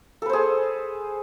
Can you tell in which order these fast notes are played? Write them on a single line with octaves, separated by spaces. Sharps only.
A4 B4 C5 G#4